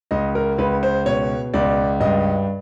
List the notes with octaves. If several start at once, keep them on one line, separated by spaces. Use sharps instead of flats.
C#2 D#5
A#4
C#2 B4
C5
B2 C#5
C#2 D5
G2 D#5